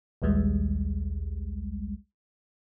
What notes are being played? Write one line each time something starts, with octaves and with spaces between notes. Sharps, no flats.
A#1 D#2 G3 G#3